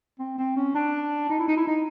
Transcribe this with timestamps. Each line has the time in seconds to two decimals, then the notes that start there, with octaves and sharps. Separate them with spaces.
0.19 C4
0.38 C4
0.57 C#4
0.75 D4
1.30 D#4
1.40 E4
1.48 D#4
1.57 E4
1.67 D#4